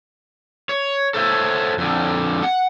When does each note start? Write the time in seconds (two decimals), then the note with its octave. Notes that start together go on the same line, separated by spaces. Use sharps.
0.69 C#5
1.14 A4 C5 C#5 E5
1.78 F2 D3
2.43 F#5